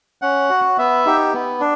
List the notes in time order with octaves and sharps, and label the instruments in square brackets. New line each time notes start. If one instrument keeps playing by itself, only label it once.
[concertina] C#4 F#5
F#4
B3 E5
D#4 G4
B3
D4